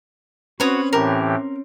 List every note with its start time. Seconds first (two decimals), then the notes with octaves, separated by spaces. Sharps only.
0.60 C4 C#4 F#4 B4 C#5 D#6
0.93 A2 E3 G4 A#4